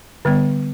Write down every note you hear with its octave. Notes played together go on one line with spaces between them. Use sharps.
D3 G3 B3